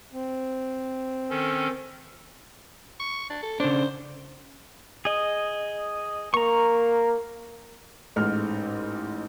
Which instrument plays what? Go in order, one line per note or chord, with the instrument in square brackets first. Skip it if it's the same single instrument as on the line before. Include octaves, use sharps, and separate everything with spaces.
[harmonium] C4
[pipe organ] D#3 C#4 A4
[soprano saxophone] C#6
D4
A4
[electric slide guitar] C#3 D4 [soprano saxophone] C5
[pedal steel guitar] G#4 D#5
[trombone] A#3 [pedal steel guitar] A#5 C#6
[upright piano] A1 G#2 F6